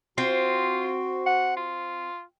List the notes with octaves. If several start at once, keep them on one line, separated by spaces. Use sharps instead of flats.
C4 F4 F#4
F#5
F4